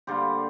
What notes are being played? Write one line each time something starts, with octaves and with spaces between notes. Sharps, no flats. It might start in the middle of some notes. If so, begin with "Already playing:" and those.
D3 G3 A#3 G4 C5